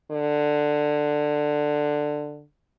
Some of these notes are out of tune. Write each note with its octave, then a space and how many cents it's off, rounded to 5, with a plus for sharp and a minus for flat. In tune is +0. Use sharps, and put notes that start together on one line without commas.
D3 +10